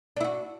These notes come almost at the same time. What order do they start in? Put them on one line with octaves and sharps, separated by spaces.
D4 E4 F#4